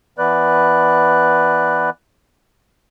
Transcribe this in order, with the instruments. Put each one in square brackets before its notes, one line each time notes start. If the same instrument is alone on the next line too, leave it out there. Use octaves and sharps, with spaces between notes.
[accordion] E3 B3 B4 D5 F#6